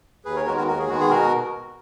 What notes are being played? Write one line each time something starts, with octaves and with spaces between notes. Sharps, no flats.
D#2 G#4 B4
A#4 C#5
D#3 G#3 B3 F#4 A#4
F#4 A#4
D#2 F#4 A#4
G#4
D#3 G#3 B3 F#4
G#4
B2 F#4 A#4